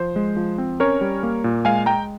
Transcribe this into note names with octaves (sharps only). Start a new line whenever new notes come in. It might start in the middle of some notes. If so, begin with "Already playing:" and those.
Already playing: F3 C5
G#3
F3
C4
C#4 A#4 C#5
G3
A#3
A#2
G#3 F5 G#5
G#3 G5 A#5